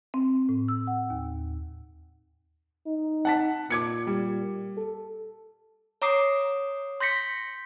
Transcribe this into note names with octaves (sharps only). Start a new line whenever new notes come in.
C4
A2
E6
F#5
D#2
D#4
F#5 A5 B6
A#2 D6 G#6 C#7
G3
A4
C#5 A#5 D6 D#6 C7
C6 G6 A#6 B6 C#7